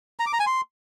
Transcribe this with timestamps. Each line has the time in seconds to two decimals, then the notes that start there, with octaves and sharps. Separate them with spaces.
0.20 A#5
0.26 D6
0.33 A#5
0.40 G#5
0.47 C6